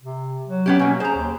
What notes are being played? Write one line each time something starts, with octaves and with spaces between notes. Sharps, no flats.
C3
F#3
B3 C#4 G4
B2 A#3 C#4
G#4 C5 A#5
D#2